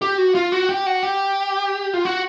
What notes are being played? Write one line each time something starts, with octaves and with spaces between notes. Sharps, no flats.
G4
F#4
F4
F#4
G4
F#4
G4
F4
F#4